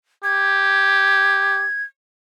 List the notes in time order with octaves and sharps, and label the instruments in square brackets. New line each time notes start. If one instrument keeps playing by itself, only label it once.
[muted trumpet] G4 [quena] G#6